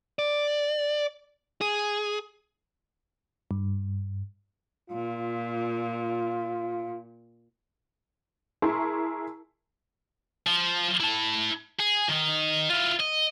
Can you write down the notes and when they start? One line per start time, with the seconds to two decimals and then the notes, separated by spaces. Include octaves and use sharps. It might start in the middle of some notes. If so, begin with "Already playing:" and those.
0.19 D5
1.61 G#4
3.51 G2
4.90 A#2 F4
8.62 E4 G#4 A#4 A5 C6 C#6
10.46 F3
11.01 E4 A5
11.79 G#4
12.09 D#3 D#4
12.70 E4 F4
13.00 D#5